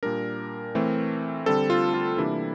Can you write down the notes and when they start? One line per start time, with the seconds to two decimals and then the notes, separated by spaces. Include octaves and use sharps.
0.03 A#2 G3 D4 A#4
0.75 E3 A3 C4
1.46 D3 G3 C4 A4
1.70 F4
1.94 F4
2.17 C3 E3 G3 A#3 D4 E4